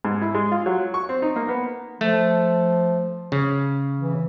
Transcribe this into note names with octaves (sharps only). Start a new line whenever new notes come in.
G#2
E4
G#3
F4
F#3
C#6
C4
D#4
A#3
B3
F3 A3
C#3
E3